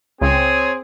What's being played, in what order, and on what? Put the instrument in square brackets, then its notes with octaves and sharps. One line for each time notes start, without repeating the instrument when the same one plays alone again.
[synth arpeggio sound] C#2 [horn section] C4 [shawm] G#4 [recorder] C#5